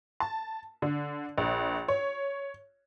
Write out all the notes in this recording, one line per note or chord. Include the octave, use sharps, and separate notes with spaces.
A5
D3
A#1
C#5